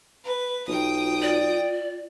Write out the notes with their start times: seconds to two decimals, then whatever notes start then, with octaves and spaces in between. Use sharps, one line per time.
0.24 B4
0.67 B1 F4 G5 D#6
1.22 D5